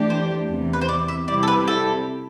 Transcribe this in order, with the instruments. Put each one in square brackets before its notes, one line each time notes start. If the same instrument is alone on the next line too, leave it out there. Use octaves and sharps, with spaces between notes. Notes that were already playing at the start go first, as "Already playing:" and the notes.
Already playing: [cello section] E3 A3 D4 G4
[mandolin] C5
[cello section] E2 C3 E3
[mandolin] B4
C5
D5
E5
[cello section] C3 G3 C4 E4 G4 [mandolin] D5
[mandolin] A4
B4
A4